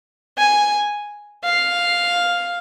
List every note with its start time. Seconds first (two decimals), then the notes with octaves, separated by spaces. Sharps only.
0.38 G#5
1.44 F5